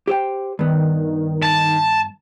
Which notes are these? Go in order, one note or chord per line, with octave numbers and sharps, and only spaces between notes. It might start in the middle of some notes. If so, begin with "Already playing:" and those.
G4 C5 G5
G2 D#3 B3
A5